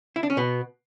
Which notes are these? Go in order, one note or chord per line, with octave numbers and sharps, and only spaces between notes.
E4
D4
C#4
B2 B3